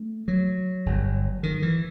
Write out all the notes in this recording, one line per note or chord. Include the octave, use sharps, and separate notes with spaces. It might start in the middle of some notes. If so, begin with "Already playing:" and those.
Already playing: A3
F#3
G1 G2
D#3
E3